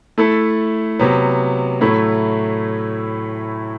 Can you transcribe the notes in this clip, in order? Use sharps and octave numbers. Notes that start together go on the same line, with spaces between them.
A3 E4 A4
C3 F#3 B3
A2 F#3 A3 E4